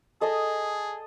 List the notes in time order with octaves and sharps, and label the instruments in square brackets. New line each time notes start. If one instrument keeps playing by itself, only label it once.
[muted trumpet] G#4 [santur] A4 D#5